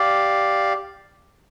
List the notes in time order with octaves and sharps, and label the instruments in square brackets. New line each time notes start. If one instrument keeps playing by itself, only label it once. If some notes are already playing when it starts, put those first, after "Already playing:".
Already playing: [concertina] G4 D5 F5